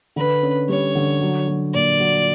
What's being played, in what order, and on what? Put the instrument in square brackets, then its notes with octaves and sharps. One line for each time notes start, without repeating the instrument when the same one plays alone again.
[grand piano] D3 [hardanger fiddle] B4
[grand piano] C#4
[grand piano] G3 [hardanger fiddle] C#5
[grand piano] D3
F#3
F#3
[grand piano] A#2 [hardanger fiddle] D5
[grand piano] F#3